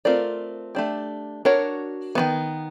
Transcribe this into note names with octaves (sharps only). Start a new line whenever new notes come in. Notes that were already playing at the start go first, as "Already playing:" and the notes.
A3 C4 F4 A#4 D5
A3 D4 G4
D4 F#4 A#4 C#5
D#3 F#3 B3